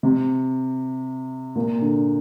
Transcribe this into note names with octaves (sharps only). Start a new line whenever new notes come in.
C3
A#2
D3